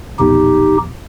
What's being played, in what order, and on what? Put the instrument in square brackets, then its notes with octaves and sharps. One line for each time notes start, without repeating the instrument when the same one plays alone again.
[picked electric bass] E1 A#1 B3 [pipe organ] D#4 G4